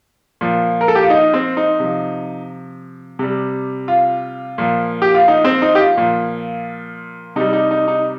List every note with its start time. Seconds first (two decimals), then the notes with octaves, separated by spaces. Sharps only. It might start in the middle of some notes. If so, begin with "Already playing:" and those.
0.41 A#2 F3
0.81 A#4
0.88 A4
0.95 G4
1.03 F4
1.10 D#4
1.34 C4
1.57 D#4
1.80 C3 F3
3.19 C3 G3
3.88 F4
4.58 A#2 F3
5.02 G4
5.14 F4
5.28 D#4
5.45 C4
5.62 D#4
5.75 G4
5.80 F4
5.97 A#2 F3
7.36 C3 G3 D#4
7.53 D#4
7.71 D#4
7.88 D#4